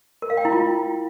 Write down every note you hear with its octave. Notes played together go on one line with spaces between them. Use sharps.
A#4
F5
G5
E4
F4